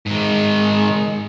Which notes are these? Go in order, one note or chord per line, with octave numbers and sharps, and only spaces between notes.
G#2 D#3 G#3